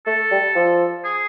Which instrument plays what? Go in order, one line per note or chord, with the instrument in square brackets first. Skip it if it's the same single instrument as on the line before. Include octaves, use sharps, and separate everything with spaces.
[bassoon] A3 [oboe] A4
[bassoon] G3
F3
[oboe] G#4